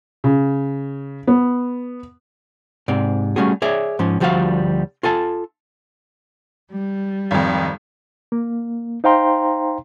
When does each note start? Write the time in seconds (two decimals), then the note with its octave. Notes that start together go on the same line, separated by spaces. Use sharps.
0.24 C#3
1.27 B3
2.88 G#2 C3 D5
3.36 G3 A3 C#4 F#4 G#4
3.62 G#4 C#5 D5 E5
3.99 G#2 F3 C#4
4.20 D2 F3 G3 F#4 B4 F5
5.03 F4 A4 G#5 A5
6.70 G3
7.31 G#1 F2
8.32 A#3
9.04 D#4 C5 F5 G5 A#5 C6